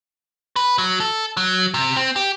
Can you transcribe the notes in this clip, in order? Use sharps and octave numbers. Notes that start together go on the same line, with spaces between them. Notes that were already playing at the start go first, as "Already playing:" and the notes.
B4
F#3
A4
F#3
C3
C4
G4